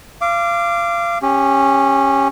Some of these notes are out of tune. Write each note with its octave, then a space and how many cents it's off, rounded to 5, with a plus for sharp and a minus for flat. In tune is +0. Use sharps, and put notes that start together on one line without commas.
F5 -30 D6 +0
C#4 -10 G4 +15